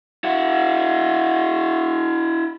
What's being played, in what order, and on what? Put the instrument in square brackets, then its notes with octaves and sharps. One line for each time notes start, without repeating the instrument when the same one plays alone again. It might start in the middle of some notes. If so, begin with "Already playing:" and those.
[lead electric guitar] E4 F#4